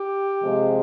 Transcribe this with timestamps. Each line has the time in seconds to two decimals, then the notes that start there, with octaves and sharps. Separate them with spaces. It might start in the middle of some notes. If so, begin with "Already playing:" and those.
Already playing: G4
0.43 C3 F3 G#3